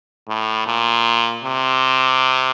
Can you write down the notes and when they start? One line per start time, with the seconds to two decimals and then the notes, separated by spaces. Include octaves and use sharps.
0.28 A2
0.67 A#2
1.44 C3